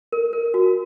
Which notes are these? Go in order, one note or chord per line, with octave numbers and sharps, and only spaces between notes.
A#4
A#4
F#4